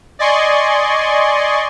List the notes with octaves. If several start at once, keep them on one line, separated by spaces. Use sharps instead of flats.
D5 D#5 G#5 C6 C#6